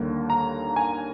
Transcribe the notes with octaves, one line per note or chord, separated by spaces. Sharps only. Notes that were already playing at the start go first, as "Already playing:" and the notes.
Already playing: D#2 D3 G3 A#3
A#5
G#5